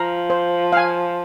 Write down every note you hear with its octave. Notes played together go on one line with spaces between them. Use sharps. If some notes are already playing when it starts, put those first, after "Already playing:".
Already playing: F3 F5 A#5
C5
F5 G#5